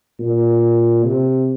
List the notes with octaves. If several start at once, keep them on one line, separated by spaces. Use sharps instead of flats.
A#2
C3